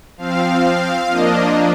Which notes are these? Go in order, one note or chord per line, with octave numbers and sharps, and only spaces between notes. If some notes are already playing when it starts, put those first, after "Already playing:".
F3 C4 F5
F3 A#3 D4 D#5